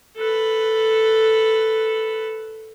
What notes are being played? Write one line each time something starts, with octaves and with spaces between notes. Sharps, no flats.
A4 B4